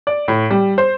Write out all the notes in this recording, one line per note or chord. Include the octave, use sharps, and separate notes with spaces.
D5
A2
G3
C5